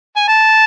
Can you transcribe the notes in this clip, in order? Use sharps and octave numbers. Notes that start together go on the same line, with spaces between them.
G#5
A5